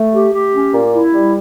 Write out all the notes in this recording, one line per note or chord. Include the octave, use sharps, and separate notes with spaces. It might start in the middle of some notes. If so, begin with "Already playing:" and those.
Already playing: A3
G4
G4
C#4
A#2
E4
G3